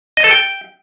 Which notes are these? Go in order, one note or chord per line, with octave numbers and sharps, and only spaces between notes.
D#5
A4
G5